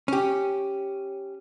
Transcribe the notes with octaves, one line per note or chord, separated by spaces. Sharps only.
C#4 G4